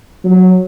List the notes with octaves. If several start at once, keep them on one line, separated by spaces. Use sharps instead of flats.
F#3